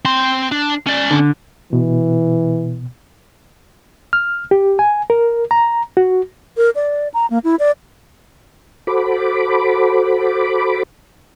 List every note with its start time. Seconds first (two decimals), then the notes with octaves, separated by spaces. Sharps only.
0.05 C4 C6
0.52 D4
0.87 C#4 D5
1.11 D3
1.73 B2 E3
4.13 F6
4.51 G4
4.79 G#5
5.10 A#4
5.51 A#5
5.97 F#4
6.57 A#4
6.75 D5
7.14 A#5
7.30 A#3
7.44 E4
7.59 D5
8.87 F#4 A4 C5 B5 D6